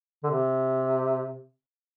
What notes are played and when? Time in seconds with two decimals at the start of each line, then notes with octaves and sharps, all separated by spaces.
0.24 D3
0.31 C3